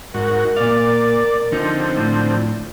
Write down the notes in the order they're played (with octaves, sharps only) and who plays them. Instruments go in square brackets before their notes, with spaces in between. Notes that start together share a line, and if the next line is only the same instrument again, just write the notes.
[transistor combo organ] G#2 F#4 [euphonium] A#4
[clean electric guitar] A#2 F5 [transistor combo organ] D5
[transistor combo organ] D3 F3 C4 [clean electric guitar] D#4
[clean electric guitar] A2 [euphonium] D4